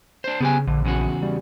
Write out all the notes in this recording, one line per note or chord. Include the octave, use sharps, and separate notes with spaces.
D4 C5
C#3 B3 G4 G#5
A#1 D3
E2 C#3 F#4
G3